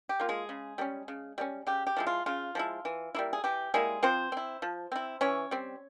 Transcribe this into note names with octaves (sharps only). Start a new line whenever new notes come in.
G4
A#3 F4
G#3 G#4
C#3
G3 A#3 C#4
C#3
G3 A#3 C#4
C#3 G4
G4
F3 G#3 E4
F4
C#3 F4
F3 G#3 E4
E3
G3 A#3 E4
G#4
E3 G4
G3 G#3 A#3 E4 G#4
F3 C4 C5
C4 E4
F3
C4 E4
E3 C#4 C#5
G3 C4